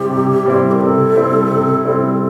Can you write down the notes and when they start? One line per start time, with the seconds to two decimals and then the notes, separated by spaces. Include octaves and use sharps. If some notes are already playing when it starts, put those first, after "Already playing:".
Already playing: C3 G3 C4 E4 G4
0.10 C3
0.46 G3 C4 E4
0.71 A#4
0.80 C3 A4
1.16 G3 C4 E4
1.51 C3
1.85 G3 C4 E4